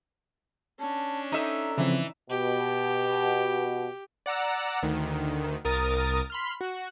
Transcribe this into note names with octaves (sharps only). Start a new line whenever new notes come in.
C#4 D4 A5
D#4 A4 E5
C#3 E3 F3 C4
B2 G4
D5 F#5 A#5 E6
D2 D#3
C2 A#4 D#6 A6
B5 C6 F6
F#4